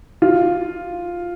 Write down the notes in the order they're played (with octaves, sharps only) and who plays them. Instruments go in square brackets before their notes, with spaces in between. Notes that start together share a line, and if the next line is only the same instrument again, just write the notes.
[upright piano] F4